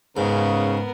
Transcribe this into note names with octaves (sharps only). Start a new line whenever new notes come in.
G#2 C#3 B3 A#4